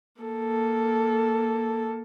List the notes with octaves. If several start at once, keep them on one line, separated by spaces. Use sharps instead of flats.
A#3 A4